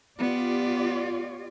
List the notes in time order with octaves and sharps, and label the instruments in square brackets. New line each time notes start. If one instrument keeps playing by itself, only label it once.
[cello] B3 [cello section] F4 G4 D5